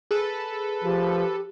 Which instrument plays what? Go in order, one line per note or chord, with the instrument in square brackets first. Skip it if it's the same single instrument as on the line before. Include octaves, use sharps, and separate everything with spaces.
[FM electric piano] G#4 [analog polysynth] A4 B4
[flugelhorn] F3 [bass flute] G4